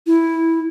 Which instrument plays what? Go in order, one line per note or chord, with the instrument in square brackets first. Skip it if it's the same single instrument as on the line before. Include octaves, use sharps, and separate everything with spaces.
[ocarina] E4